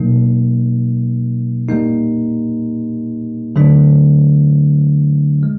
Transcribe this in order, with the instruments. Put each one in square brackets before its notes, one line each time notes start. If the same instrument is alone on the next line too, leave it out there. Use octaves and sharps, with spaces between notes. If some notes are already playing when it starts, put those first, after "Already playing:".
Already playing: [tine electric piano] B2 F#3 A#3 D#4
A#2 G3 A#3 D#4
D3 F#3 A3 D4
G#3